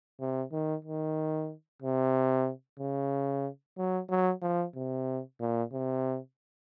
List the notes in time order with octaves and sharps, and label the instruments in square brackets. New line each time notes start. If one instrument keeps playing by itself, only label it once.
[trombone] C3
D#3
D#3
C3
C#3
F#3
F#3
F3
C3
A#2
C3